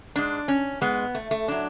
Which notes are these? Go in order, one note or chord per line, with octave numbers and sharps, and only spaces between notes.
G#2 G#3 D4
C#4
G#2 G#3 B3
A3
A3
A2 F#3 D4